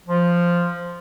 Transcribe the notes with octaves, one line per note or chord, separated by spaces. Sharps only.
F3